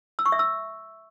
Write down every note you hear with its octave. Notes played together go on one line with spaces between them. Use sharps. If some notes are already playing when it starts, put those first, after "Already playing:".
E6
C#6
E5
E6